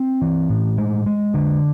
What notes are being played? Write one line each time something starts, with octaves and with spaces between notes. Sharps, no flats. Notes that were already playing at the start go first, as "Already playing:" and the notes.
Already playing: C4
E3
A2
G#3
G#3
D3